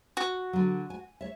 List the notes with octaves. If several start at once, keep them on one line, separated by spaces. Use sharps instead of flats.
F#4
D3 F#3
G#5
C#5 E5